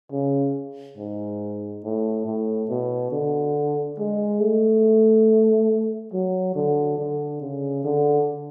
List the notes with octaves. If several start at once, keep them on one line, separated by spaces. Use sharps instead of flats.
C#3
G#2
A2
A2
B2
D3
G#3
A3
F#3
D3
D3
C#3
D3